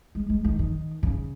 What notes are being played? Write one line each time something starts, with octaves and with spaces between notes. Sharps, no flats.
G#3
G#3
D#3
D#3
C#3